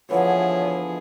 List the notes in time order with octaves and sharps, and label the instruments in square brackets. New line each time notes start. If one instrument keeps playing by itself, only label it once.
[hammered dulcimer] B2 D3 E3 [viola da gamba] F3 G#4 [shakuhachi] C#5